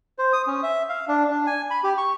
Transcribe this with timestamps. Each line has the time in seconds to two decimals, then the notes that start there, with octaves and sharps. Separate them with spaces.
0.18 C5
0.33 D#6
0.47 C#4
0.63 E5
0.89 F5
1.08 D4
1.31 D4
1.47 G#5
1.71 B5
1.84 G4
1.98 C#6